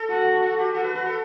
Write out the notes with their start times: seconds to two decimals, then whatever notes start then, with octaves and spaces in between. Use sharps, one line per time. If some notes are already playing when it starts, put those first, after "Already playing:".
Already playing: A4
0.10 F#4
0.43 A4
0.59 G4
0.74 F#4 A4
0.84 B4
0.95 B4
1.06 A4